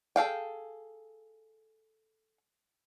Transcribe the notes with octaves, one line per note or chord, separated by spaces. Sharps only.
G#4 A4 F5 G5